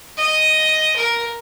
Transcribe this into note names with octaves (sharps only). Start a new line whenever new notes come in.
D#5
A#4